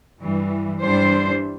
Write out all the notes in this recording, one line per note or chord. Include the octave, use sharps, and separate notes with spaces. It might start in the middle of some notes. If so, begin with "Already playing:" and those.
G2 E3 G3
G2 E3 G3 D4 C5